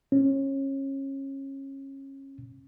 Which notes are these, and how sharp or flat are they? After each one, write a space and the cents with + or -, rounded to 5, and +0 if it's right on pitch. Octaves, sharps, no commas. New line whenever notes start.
C#4 -25